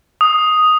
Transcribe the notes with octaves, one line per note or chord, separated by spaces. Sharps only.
D#6